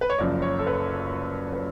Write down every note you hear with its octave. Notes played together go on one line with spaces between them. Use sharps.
B4
C#5
F#1 F#2 F3 D5
C#5
A4
B4
B4